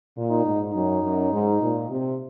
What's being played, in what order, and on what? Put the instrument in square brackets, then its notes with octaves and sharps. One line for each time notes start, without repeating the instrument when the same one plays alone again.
[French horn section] A#2
[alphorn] D#4
[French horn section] G#2
[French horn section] F#2 [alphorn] D#4
[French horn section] F#2
G#2
A#2
C3